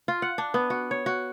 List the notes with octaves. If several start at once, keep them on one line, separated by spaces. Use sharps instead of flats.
F4
F#5
D4
B3
F#4
C#5
F#4